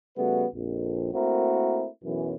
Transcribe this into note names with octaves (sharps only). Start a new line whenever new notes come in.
C#3 G3 A3 B3 F#4 B4
A#1 F2
A3 A#3 C4 E4 F#4 A#4
B1 F#2 E3